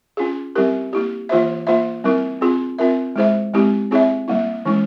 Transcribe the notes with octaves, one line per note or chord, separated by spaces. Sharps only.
C#4 F4 G#4
G3 C4 E4 G4 A#4
A#3 E4 G4
E3 A#3 F4 C5 E5
A#3 F4 C5 E5
G3 C4 E4 A#4
C4 F4 G#4
C4 F4 A#4 E5
G#3 E4 G#4 C5 E5
G#3 C4 E4 G4
C4 E4 G#4 C#5 E5
G3 A#3 E4
E3 G#3 C#4 E4